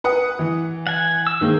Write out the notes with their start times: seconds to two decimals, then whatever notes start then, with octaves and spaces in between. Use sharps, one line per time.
0.04 B4 F#5 D#6
0.39 E3
0.87 F#5 G#5
1.27 E6
1.41 D#3 G#3 A#3 C5